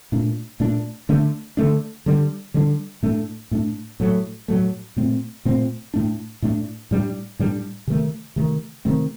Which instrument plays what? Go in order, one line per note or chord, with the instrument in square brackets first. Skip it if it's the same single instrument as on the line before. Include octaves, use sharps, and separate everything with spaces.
[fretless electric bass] A#2 A3 D4
A#2 A3 D4
D3 A3 D4
D3 A3 D4
D3 G3 D4
D3 G3 D4
A2 A3 D4
A2 A3 D4
A2 F#3 A3
A2 F#3 A3
A#2 A3 C4
A#2 A3 C4
A2 A3 D4
A2 A3 D4
A2 G3 A#3 D4
A2 G3 A#3 D4
C3 D#3 A3
C3 D#3 A3
C3 D#3 A3 C4